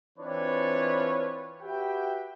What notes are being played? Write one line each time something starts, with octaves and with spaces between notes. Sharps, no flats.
E3 C4 D4 F4 B4 C#5
F#4 G4 B4 E5 G5